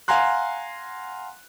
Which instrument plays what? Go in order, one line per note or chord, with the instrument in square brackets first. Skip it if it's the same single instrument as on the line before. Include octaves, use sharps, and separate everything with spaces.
[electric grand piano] F5 F#5 G#5 A#5 C6 F#6